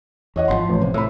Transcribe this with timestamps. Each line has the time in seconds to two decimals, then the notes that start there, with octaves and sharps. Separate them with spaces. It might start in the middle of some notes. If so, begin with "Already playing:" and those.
0.36 E2 C#5 D#5 F#5
0.48 G#1 C#3 F3 C6
0.69 A1
0.81 C3 C5
0.94 A2 B5 E6